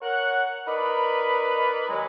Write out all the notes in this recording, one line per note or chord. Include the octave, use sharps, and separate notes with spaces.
A#4 C#5 F#5
D#4 A#4 B4 D5 B5
D#2 F#3 G#3